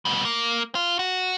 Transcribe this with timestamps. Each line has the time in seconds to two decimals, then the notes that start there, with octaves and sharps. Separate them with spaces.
0.05 B2 G3
0.25 A#3
0.75 F4
0.99 F#4